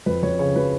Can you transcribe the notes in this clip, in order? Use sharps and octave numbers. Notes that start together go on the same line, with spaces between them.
F2 B4
F2 C#5
C#3 C#5
F3 B4